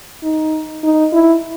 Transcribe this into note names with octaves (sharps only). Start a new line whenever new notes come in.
D#4
D#4
E4